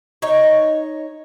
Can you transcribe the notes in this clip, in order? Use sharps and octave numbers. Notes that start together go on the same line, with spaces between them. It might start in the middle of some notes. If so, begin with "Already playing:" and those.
D#4 C#5